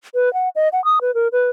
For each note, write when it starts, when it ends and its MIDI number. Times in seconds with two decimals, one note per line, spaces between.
0.14 0.32 71
0.34 0.49 78
0.56 0.69 75
0.73 0.83 78
0.85 0.99 87
1.01 1.14 71
1.14 1.28 70
1.32 1.50 71